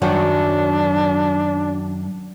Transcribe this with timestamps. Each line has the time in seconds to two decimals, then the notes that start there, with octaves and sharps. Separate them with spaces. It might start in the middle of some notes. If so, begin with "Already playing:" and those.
0.02 F#2 D#3 F#3 D4